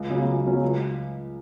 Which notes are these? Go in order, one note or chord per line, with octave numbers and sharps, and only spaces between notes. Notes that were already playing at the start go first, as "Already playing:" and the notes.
Already playing: C#2
C#3 F#3 C#4
C#2
C#3 F#3 C#4
C#2